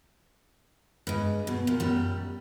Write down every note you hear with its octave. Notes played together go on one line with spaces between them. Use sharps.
G2 G#3
B2
A#2
F#2 G3